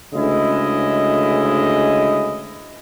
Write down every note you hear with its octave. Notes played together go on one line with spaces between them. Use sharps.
D2 C#3 G#3 E4 D#5